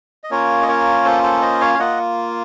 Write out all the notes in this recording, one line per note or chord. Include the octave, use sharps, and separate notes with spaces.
D#5
A#3 C#4 F4 A#4 C#5
D#5
A#4 C#5
A4 C5
A4 C5
C5 D#5
C#5 F5
F5
A#3 F4 D#5 F#5